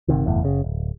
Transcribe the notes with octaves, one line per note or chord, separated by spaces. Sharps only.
G1 D2 C3 D#3
F#1 E2 A2
F#1 C#3
D1